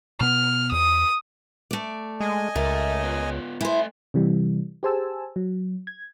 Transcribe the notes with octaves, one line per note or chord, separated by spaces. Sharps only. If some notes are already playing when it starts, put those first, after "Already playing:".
B2 B3 F6
E2 D#6
A3 D5
G#3 D#5 G#5
C#2 A3 A#4 E5
B3 F4 B4
A3 E4 C5 G#5
C3 E3 G3
G4 G#4 C5 G#5 A5 E6
F#3
G#6